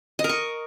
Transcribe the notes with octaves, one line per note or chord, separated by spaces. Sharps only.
D#5
A#4
C#6